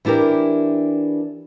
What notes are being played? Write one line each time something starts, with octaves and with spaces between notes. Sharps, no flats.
E3 D4 E4 G4 A#4